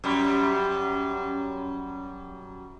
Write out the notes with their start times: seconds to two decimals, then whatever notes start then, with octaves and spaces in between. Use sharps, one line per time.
0.04 F#2 G3